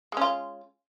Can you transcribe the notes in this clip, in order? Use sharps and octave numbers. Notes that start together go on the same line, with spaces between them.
G#3 C#4 F4